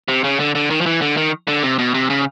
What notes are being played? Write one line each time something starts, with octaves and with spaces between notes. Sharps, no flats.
C3
C#3
D3
D3
D#3
F3
E3
D3
D#3
D3
C3
B2
C3
C#3